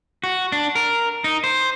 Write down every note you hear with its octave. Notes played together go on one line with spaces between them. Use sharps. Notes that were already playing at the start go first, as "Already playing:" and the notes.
F#4
D4
A#4
D#4
C5